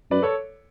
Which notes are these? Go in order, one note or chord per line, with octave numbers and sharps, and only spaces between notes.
F#2 B4 D5
A4 C#5